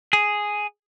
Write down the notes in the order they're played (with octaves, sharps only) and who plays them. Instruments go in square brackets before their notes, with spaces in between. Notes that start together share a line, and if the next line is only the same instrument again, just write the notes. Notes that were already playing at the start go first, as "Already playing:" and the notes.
[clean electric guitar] G#4